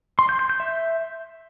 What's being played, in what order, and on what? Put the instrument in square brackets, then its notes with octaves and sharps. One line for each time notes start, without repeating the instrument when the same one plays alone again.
[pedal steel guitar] C6
G6
G6
G6
E5